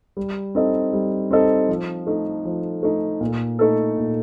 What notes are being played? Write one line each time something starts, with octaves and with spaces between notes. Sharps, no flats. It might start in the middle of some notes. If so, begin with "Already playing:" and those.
G3
C4 D#4 A4 D#5
G3
C4 D#4 A4 D#5
F3
A3 D#4
F3
A3 D#4
A#2
A3 D#4 A4
A#2